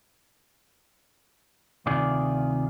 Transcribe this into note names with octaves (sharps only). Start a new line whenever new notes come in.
D2 C3 D#3 F4 G#4 D5